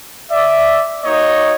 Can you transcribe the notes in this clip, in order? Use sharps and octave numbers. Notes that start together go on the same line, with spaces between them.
D5 E5
A#3 D#4 F#4 C#5 D#5